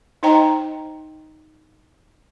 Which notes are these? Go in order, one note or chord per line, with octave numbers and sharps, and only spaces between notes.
D#4 C5 D#5 G5 A#5